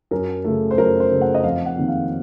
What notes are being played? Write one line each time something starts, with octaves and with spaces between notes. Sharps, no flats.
F#2 A#4
C#3 A3
C5
F#2 A#4
C5
C#3 A3
F#5
D#5
F2 F5
F#5
C3 D#3 A#3
F5